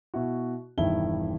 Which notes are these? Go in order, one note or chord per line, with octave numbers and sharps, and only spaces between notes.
B2 E4 F#4
E1 G2 D#3 E4 G7